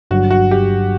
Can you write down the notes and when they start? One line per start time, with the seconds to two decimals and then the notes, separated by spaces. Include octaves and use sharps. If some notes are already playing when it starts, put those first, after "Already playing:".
0.11 G1 G2 F#3 F#4
0.31 F#4
0.51 G4